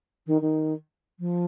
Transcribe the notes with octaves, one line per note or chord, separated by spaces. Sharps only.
D#3
D#3
F3